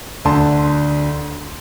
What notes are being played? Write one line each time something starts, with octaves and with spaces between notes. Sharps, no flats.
D2 D3 A5 C6